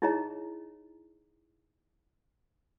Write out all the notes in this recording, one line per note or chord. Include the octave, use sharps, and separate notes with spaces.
D#4 E4 G#4 C#5 D#5 A#5